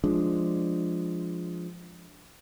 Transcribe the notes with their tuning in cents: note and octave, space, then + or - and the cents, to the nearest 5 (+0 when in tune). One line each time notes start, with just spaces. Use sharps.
F3 +0 G#3 +0 D4 +0